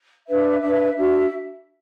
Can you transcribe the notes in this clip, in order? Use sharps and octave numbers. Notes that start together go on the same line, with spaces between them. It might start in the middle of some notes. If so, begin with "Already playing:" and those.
D4 B4 E5
D4 B4 E5
E5
E5
D4 F#4 A4 E5